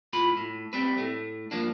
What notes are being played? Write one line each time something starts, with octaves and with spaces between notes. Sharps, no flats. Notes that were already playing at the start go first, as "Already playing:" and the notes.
A2 F4 B5
A2
G3 C4 B4
A2 A3
G2 F3 A#3 D4